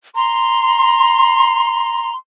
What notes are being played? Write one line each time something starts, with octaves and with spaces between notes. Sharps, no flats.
A#5 C6